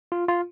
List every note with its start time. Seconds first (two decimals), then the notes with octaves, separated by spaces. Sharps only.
0.12 F4
0.28 F4